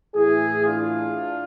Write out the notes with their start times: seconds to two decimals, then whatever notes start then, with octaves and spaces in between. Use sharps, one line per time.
0.15 A2 E3 E4 G#4
0.66 D4 F4